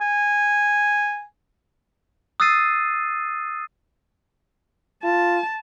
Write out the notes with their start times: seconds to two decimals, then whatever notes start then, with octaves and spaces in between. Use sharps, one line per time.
0.01 G#5
2.40 D#6 E6 F#6 A6 C7 D#7
5.04 F4 A5